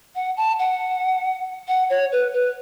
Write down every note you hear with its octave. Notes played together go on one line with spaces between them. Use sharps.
F#5
A5
F#5
F#5
C#5
B4
B4